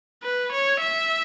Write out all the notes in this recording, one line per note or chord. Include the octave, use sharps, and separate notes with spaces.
B4
C#5
E5